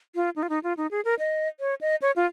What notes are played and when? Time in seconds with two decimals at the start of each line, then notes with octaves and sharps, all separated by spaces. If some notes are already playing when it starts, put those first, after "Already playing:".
0.15 F4
0.36 D#4
0.43 F4
0.49 D#4
0.63 F4
0.77 D#4
0.91 G#4
1.05 A#4
1.19 D#5
1.60 C#5
1.81 D#5
2.02 C#5
2.16 F4